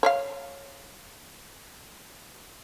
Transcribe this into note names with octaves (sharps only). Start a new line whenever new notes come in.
C#5 D5 F5